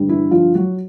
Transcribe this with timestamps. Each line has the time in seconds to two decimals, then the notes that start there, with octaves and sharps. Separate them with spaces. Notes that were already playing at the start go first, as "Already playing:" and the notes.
Already playing: G2 D3 G3
0.09 E3 E4
0.31 F3 F4
0.55 F#3 F#4